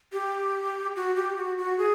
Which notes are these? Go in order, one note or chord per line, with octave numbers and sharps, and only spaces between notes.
G4
F#4
G4
F#4
F#4
G#4